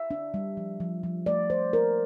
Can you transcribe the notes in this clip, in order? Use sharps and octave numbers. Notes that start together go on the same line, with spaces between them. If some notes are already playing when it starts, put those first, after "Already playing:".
Already playing: E5
D4
G3
F3
F3
F3
A3 D5
F3 C5
D4 A#4